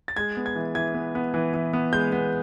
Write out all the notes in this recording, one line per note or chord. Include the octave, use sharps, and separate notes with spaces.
A6
G#3 G#6
B3
G#6
E3
E3 G#6
B3
B3
E3
E3
B3
G#3 G6
B3